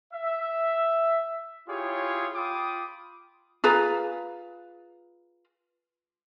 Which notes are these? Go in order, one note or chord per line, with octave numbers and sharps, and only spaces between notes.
E5
E4 F4 G4 G#4 C#5
F4 G5 B5 D6 D#6
F4 G#4 B4 A#5